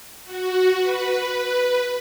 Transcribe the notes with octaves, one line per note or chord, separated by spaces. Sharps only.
F#4
B4